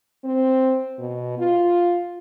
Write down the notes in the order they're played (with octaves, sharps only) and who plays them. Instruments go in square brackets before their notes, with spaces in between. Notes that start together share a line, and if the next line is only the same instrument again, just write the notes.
[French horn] C4
B2
F4